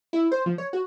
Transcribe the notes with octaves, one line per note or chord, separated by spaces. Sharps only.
E4
C5
F3
C#5
F#4